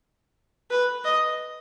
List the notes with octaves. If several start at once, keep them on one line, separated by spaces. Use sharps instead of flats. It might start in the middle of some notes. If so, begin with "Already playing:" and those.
B4
D#5